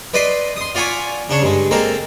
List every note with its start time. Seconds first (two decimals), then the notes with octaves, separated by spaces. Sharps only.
0.14 B4 D5 D#5 B5 C6
0.56 C6 D#6
0.75 F4 D5 F#5 G#5 B5 C#6
1.29 C#3 D4 C#5
1.42 G2 G#3
1.71 G#3 A#3 C4 A4